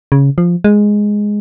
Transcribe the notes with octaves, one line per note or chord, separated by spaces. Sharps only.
C#3
F3
G#3